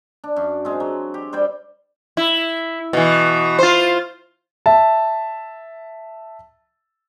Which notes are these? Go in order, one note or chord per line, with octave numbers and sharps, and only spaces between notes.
D4
F#2
G#3 C4
F#3
G4
G3 C5 D5 G5
E4
B2 E3
F4 C5
E5 A5